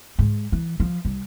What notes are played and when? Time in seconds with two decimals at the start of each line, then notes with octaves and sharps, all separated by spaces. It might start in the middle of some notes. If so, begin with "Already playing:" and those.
0.19 G#2
0.52 E3
0.80 F3
1.05 C2